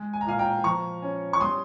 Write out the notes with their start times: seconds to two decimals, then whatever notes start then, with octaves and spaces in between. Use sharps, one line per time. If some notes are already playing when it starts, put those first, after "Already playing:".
Already playing: G#3
0.13 G#5
0.21 A#5
0.26 A#2 F5 G#5
0.39 G5 A#5
0.64 F3 A#5 C#6
1.02 C#4
1.33 C#6
1.40 G3 C6 D#6